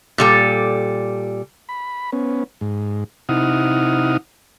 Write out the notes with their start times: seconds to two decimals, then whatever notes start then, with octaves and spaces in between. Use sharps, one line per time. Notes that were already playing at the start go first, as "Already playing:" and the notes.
0.18 A#2 G3 A4
1.69 B5
2.12 B3 C#4
2.61 G#2
3.29 C3 D#4 E4 F#5 D#6 F6